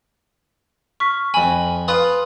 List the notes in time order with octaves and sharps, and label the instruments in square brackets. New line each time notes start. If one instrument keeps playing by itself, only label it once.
[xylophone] C#6 F6 B6
[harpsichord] F2 B5 [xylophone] G#5
[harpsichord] F4 B4 D#6